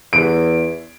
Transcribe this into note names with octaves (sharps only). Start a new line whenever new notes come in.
E2 D7